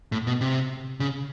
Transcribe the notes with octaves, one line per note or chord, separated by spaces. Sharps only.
A2
B2
C3
C#3